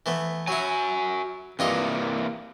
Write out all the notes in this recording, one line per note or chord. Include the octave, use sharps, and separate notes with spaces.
E3 A3 B3
F#3 E4 F#4 G#5
G2 C3 E3 A#3 F4 D#5